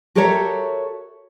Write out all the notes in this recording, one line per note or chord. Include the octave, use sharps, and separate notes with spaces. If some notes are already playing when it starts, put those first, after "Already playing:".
F#4 G4 A4 A#4 C#5 E5